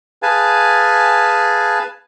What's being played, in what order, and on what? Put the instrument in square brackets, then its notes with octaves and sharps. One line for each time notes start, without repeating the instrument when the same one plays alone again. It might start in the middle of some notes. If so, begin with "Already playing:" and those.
[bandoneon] G#4 B4 F5 G#5 A5